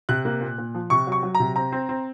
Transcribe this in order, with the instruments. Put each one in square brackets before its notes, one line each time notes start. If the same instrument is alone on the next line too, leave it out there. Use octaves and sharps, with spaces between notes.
[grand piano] C3 F#6
A#3
A#2
A#2
F3
C3 C#6
F#3 C#6
F#3
A#5
C3
C4 A#5
C4
C4